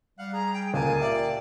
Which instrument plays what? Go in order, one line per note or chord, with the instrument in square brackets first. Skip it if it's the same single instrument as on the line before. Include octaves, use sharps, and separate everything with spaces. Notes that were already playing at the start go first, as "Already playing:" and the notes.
[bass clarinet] G3 [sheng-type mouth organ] F5 F#5 F#6
[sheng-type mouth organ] G#4 [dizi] A#5
[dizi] G5
[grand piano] C#2 [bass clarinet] D3 [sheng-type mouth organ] A#3 A5 [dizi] G#5
[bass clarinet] A#2 [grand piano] G4 E5 [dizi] D5